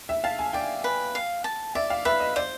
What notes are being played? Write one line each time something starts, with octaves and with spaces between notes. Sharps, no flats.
E5
F5 A5
G#5
D5 G5
B4
F5
A5
D5 E5
F5
B4 E5
D#5
C5 D5